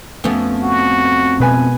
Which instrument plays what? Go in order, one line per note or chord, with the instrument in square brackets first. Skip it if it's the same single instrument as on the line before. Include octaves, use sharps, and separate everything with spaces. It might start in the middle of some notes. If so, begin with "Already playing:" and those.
[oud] F2 B3 [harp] A3 C#4
[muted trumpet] F#4
[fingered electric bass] B2 [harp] G#3 B4 G#5